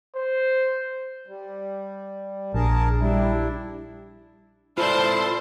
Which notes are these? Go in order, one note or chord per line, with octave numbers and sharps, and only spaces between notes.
C5
G3
A#1 D4 G#4 A#4 A5
G3 D4 E4
E4 F4 A4 C5 D5 A5